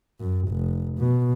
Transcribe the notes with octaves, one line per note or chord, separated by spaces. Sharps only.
F#2
F1
B2